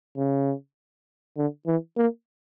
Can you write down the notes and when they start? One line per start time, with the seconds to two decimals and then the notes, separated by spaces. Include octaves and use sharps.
0.17 C#3
1.37 D3
1.66 E3
1.97 A#3